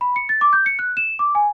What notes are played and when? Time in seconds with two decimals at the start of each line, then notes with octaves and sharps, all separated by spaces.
0.01 B5
0.16 C#7
0.29 A6
0.41 D6
0.53 G6
0.66 C#7
0.79 F#6
0.97 E7
1.19 D6
1.35 G#5